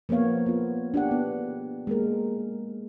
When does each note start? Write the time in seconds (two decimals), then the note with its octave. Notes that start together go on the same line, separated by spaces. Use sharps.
0.09 F3 A#3 B3 C#5 F5
0.46 B3 F4
0.94 D4 G4 F#5
1.11 B3
1.87 G#3 A#3 A#4